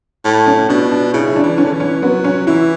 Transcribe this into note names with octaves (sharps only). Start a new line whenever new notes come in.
A2
C#4
B2 D4
D4
C#3 E4
E4
D4
E3
C#4
D3
E3
C#4
F#3 B3
C#4
E3 E4